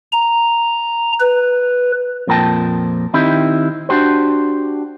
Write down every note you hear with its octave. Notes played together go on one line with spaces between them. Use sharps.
A#5
B4
F2 A#2 F3 A#4 G5 A5
D#3 C4 D#4 E4 G4
D4 F#4 G4 C5